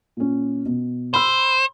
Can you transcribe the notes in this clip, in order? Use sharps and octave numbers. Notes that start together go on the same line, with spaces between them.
A#2 C#4
B2
C5 B5 E6